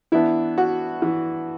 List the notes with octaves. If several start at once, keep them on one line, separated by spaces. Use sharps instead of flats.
E3 B3 D4 E4
F#4
E3